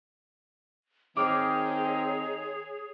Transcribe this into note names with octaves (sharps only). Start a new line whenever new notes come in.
D#3 C4 D#4 G#4 C#5 D6 F6 C7